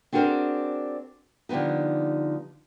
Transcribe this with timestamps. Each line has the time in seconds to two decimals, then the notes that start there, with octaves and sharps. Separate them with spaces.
0.12 C4 D4 F#4 G#4 A#4 C5
1.49 D3 F3 G3 B3 D#4